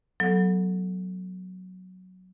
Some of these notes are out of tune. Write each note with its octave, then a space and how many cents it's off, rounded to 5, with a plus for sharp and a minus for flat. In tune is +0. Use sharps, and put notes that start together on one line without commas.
F#3 +0 B3 +0 A4 +0